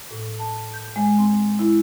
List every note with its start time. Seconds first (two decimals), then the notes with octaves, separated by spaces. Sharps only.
0.11 A2
0.39 A5
0.74 G6
0.96 G#3
1.18 C4
1.59 E4